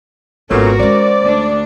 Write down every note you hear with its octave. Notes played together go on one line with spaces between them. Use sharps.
G#1 A#2 A3 B3 C#4 F#4 A#4
G#3 C#4 C5 D5
D2 D4